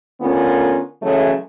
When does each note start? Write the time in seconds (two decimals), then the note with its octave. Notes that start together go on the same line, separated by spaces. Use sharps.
0.21 D3 A3 B3 C#4 F4 A#4
1.01 C#3 E3 F#3 G#3 A3